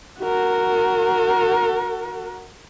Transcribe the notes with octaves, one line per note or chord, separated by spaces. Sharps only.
F#4 A#4